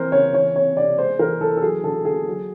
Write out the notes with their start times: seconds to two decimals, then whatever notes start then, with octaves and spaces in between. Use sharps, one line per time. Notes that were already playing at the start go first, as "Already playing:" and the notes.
Already playing: E3 C4 A#4 C5
0.12 C#3 C#5
0.33 E3 C#5
0.55 C4 C#5
0.77 C3 D5
0.98 G#3 C5
1.19 E3 A#4
1.41 E3 A4
1.57 A4
1.62 F#3 G#4
1.84 D3 A4
2.05 D3 G#4
2.27 F#3